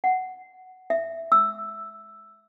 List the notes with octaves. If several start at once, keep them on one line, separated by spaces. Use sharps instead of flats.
F#5
E5
E6